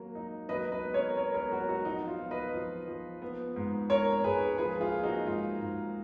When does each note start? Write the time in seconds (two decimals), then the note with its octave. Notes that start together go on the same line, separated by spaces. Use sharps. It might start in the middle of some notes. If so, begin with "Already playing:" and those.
Already playing: F#3 A#3
0.15 D#4
0.49 F#3 B4 D#5
0.72 B4 D#5
0.83 B3
0.94 A#4 C#5
1.17 B3 A#4 C#5
1.34 A#4 C#5
1.51 F#3 F#4 A#4
1.69 D#4 F#4
1.85 F3 D#4
2.08 F4
2.20 B3
2.31 B4 D#5
2.54 F3
2.88 F3
3.22 B3
3.56 G#2
3.90 G#2 A#4 C#5
4.24 G#2 G#4 B4
4.58 F3 G#4 B4
4.81 F4 G#4
4.92 A#3
5.03 D#4 F#4
5.26 G#2 F4
5.61 G#2